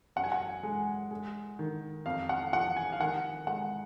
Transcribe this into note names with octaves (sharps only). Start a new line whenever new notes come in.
F#2 F#5
G#5
F#5
G#3
G#3
D#3
F2 F5
F#5
F3 F#5
G#5
F5
D#3 F#5
G#3 F#5